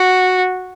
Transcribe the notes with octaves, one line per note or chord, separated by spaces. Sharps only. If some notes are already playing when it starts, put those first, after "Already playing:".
Already playing: F#4